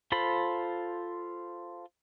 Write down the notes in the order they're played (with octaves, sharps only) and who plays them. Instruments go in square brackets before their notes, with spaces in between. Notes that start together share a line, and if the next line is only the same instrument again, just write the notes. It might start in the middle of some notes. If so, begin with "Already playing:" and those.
[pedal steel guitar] F4 A4 C5 B5